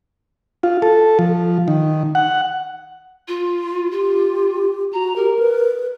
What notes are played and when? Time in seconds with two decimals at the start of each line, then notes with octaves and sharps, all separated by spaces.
0.63 F4
0.82 A4
1.19 F3
1.68 D#3
2.15 F#5
3.28 F4
3.91 F4 G4
4.93 F#4 A#5
5.16 G4 A#4
5.39 B4